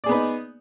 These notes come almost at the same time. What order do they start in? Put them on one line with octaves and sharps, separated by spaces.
D5 G#4 B3 B4 D#4